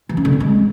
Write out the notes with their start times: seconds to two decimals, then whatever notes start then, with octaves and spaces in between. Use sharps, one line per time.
0.09 E3
0.17 C#4
0.25 D3
0.33 C4
0.40 G#3